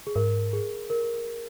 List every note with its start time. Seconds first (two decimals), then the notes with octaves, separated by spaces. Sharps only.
0.07 G#4
0.15 G#2 A#4
0.53 G#4
0.90 A#4